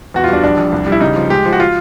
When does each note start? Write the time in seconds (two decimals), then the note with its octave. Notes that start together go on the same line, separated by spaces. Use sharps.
0.14 E2 F#4
0.24 F4
0.28 G3 D4
0.43 A#1 D4
0.57 A#1
0.72 C2
0.87 G3
0.92 E4
1.01 C#3 D#4
1.16 F3
1.30 G#3 G4
1.45 F3
1.52 F#4
1.60 F4